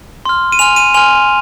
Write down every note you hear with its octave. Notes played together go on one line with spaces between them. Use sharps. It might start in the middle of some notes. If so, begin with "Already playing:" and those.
C6 F6
D#7
G#5 C6 F6 F7
D#7
G#5 C6 F6 F7